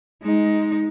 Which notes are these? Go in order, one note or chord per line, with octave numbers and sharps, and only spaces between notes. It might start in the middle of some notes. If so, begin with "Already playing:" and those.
G#3 D#4